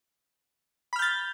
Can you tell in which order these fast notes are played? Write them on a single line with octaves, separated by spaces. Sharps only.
B5 F6 G6 A6